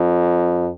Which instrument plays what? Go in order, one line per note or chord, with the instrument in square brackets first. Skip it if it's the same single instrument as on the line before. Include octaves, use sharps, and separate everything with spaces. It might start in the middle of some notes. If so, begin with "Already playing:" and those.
Already playing: [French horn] F2